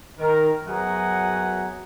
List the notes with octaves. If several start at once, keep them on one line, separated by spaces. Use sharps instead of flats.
D#3 A#4
F#2 F#3 B3 G#4 F#5 A#5